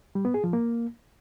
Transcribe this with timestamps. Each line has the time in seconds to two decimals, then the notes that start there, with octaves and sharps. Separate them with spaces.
0.15 G3
0.25 B3
0.34 G#4
0.44 F3
0.53 A#3